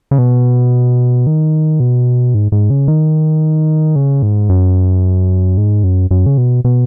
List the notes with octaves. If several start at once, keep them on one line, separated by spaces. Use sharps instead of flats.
C#3
B2
D#3
B2
G#2
G#2
C#3
D#3
C#3
G#2
F#2
G#2
F#2
F#2
C#3
B2
B2